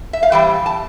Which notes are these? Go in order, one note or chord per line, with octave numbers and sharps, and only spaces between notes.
E5
F5
E3 G3 C4 G5
A5